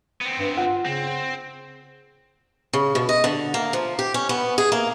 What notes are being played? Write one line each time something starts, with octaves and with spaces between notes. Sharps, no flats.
B3 C4
G2
F4 F#5
C#3 C4
C#3
B2
D#5
D3
A#3
F3
G4
C#4
B3
G#4
A#3